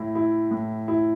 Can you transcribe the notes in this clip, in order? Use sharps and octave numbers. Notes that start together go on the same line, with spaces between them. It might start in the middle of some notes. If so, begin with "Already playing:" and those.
Already playing: A2 E4
E4
A2
E4